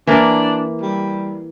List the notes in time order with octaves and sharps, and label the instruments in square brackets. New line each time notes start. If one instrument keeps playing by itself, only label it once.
[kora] E3 A#3 [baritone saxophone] D4
[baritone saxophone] G3